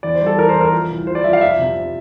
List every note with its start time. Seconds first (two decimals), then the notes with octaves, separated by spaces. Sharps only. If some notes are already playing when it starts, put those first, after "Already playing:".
0.03 E2 D5
0.15 C5
0.21 G3 A4
0.38 E3 A#4
0.49 C5
0.56 E2
0.61 A#4
0.72 F3
0.90 C2
1.07 F3 C5
1.15 D5
1.24 F3 E5
1.33 F5
1.41 F2 E5
1.59 C3
1.77 C3